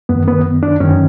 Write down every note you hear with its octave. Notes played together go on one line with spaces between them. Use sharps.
F#2 B3
D#3
B3
D4
F#2 D#3 C#4